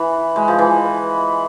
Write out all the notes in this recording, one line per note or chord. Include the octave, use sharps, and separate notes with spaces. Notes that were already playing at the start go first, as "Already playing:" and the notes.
Already playing: E3 B5
G#3
F3
E3